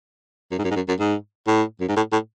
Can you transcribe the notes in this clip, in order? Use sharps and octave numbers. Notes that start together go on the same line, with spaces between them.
F#2
G#2
F#2
G#2
F#2
F#2
G#2
A2
F#2
G#2
A2
A2